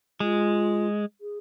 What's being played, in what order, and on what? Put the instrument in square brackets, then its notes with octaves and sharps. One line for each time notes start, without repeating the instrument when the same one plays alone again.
[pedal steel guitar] G#3 [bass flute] F4
[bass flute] G#4